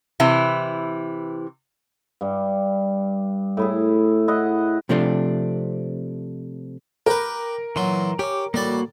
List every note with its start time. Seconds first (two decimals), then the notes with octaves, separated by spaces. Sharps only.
0.20 C3 E3 E4
2.21 G2 G3
3.57 A2 E4 G#4
4.28 E4 D#5 F#5
4.89 C3 F3 A3 C4 D4
7.06 G4 A#4 B4
7.76 A#2 E3 F#3 C6
8.19 C#4 G4 D6
8.54 A1 G3 A#3 F#4 D5